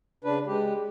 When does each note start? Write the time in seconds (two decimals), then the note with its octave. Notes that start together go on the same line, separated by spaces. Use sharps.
0.24 C#3 D4 B4
0.47 G#3 G4